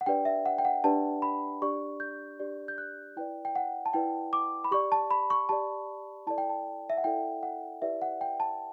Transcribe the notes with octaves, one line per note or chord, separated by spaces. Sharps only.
F#5
D4 G4 B4 D5 G5
E5
F#5
G5
F#5
D4 G4 B4 D5 A5
B5
D4 G4 D5 C#6
G6
D4 G4 D5
G6
F#6
E4 B4 D5 G5
G5
F#5
A5
E4 B4 D5 G5
D6
B5
G4 D5 C#6
A5
B5
C#6
G4 D5 A5
E4 A4 D5 A5
G5
A5
E5
F#5
E4 A4 D5 G5
F#5
E4 G4 B4 D5 E5
F#5
G5
A5